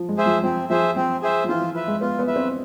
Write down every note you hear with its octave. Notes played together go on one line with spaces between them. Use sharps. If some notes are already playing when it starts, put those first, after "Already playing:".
Already playing: F3
G#3
G#4 C5 E5
F3
F3 C4
F3 G#4 C5 E5
F3 C4
G#4 C5 E5
F3
E3 F4
F3
B4 E5
G#3
B3 F4
B3
B4 E5
C4